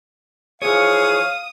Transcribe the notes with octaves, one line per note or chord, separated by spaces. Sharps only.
E3 F3 G#4 C#5 F5 D#6